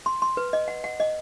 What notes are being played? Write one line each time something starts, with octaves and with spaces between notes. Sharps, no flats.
C6
C6
B4
D#5
F#5
F#5
D#5